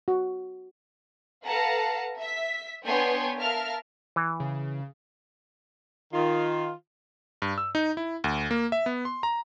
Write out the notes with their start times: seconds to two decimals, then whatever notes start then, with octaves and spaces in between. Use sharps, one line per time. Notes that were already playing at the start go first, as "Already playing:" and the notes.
0.08 F#4
1.45 A4 B4 F5 F#5 A5 A#5
2.19 E5 B6
2.83 B3 D4 C#5 G5 G#5 C6
3.37 A#4 E5 F5 A5 F6
4.16 E3
4.40 C#3
6.14 D#3 F4
7.42 G2
7.58 E6
7.75 D#4
7.97 E4
8.24 D2
8.51 A#3
8.72 E5
8.86 B3
9.05 C6
9.23 A#5